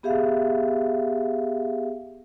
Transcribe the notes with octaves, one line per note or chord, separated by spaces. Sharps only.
B3 G4 G#4 E5 F5